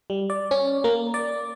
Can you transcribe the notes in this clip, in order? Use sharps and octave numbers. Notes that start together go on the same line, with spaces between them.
G3
D5
C#4
A#3
D5